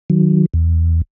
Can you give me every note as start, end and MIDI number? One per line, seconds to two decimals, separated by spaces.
0.10 0.46 51
0.10 0.46 54
0.54 1.01 40